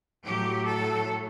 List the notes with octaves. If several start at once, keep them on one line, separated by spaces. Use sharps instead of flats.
A2 F#3 G4
A4